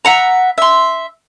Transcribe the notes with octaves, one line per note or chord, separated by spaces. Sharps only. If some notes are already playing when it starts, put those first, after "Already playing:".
E5 F#5 A#5
E5 C6